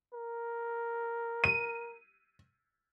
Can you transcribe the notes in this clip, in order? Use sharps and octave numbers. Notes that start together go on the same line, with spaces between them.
A#4
D#7